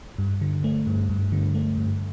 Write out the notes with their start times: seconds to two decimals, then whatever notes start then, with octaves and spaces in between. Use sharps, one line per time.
0.18 G2
0.41 D3
0.64 A3
0.87 G2
1.09 G2
1.32 D3
1.55 A3
1.77 G2